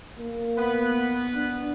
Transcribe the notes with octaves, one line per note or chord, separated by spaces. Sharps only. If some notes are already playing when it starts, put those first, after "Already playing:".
A#3
B3 B4
D4